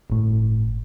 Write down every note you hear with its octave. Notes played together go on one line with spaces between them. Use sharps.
G1 A2